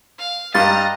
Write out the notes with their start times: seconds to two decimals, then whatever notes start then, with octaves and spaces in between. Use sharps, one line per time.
0.19 F5
0.54 G2 G3 D#5 F5 A#5 A6